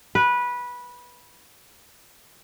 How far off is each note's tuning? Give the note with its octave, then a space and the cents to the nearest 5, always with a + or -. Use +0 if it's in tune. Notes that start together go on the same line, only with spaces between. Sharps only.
B4 -15